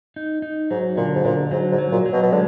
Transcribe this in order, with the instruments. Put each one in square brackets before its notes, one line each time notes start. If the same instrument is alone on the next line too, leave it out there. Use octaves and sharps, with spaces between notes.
[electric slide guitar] D#4
D#4
[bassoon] G#2 [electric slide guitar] F#3
[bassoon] A#2 [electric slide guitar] D3
[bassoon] G#2
[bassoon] A#2 [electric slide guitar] D3
[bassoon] G#2 [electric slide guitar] F#3
[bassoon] G#2
[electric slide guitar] F#3
[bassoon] A#2
[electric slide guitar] F#3
[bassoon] B2
B2
[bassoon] D3 [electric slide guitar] G#3